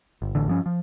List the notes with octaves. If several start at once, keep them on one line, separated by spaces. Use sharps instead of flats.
G1
A1 D3
G2 F3 C#4
F3